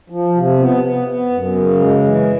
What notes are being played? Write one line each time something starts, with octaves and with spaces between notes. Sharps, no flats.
F3
C3
B3
B3
B3
F#2
C#3
G#3
E3